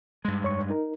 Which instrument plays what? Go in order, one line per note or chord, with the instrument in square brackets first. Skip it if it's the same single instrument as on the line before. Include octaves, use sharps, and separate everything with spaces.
[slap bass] G2 G#3
[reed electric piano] F2 C#5 C#6
D#4 A#4